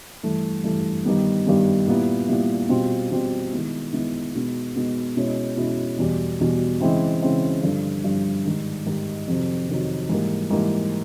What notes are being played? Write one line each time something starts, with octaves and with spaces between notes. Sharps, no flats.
G2 E3 A3
G2 E3 A3
G2 D#3 G3 B3
G2 D#3 G3 B3
A#2 G3 B3 E4
A#2 G3 B3 E4
B2 G3 C4 F4
B2 G3 C4 F4
D#3 G#3 B3 E4
D#3 G#3 B3 E4
B2 G#3 B3 D#4
B2 G#3 B3 D#4
B2 G#3 C#4 E4
B2 G#3 C#4 E4
E2 B2 G3
E2 B2 G3
C#3 E3 G#3 C4 E4
C#3 E3 G#3 C4 E4
G2 D3 F3
G2 D3 F3
G#2 D#3 G3
G#2 D#3 G3
F2 C3 D#3 F#3
F2 C3 D#3 F#3
G#2 E3 G3 A#3
G#2 E3 G3 A#3